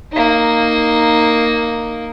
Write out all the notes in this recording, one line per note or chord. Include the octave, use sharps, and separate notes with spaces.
A#3 D#4